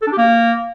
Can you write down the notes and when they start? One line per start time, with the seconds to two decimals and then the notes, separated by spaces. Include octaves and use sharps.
0.02 A4
0.07 D4
0.12 G4
0.18 A#3